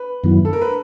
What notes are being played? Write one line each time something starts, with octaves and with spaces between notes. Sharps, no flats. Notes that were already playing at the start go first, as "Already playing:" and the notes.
Already playing: B4
F#2 D#3 F#3 B3 E4
A4
A#4
B4